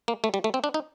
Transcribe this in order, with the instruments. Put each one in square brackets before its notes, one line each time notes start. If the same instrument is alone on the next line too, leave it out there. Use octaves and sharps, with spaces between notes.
[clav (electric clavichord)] A#3
A3
G3
A3
C4
D4
D#4